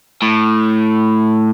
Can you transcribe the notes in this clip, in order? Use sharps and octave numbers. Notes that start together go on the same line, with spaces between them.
A2